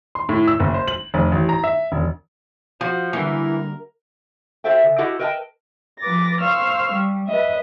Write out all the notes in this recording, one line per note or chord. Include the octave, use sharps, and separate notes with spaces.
C6
A2
E6
F#1
C5
F#7
F1
A1
A#5
E5
E1
F3 F#4
D3 E3 G3 A#3 A#4
F#4 A4 C5 E5 F5 G5
C#3
E4 F#4 G4 A4 D#5 F#5
A#4 B4 D#5 F5 G5 A5
F3 B4 D6 A6 A#6
C5 F5 C#6 E6 F6
G3
B4 D#5 E5